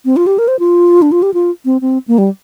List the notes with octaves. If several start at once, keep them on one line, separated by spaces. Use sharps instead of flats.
C4
F4
G4
A#4
C5
F4
D4
F4
G4
F4
C4
C4
A#3
G3